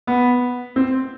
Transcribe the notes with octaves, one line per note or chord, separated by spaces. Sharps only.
B3
C4